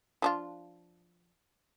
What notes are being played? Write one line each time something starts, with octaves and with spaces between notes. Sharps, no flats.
F3 D4 F4